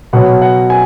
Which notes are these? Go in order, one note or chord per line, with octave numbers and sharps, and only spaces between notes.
B2 F#3 F#5
F#5
G#5